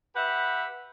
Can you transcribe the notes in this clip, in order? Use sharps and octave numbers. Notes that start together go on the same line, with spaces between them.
G4 B4 E5 F#5